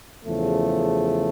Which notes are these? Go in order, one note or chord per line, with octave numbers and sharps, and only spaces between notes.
E2 C#3 F3 A3